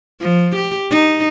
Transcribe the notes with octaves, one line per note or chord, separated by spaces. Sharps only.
F3
G4
D#4